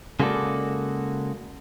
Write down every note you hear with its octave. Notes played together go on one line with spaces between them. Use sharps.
C#3 G#3 A#3 F#4 A4 D5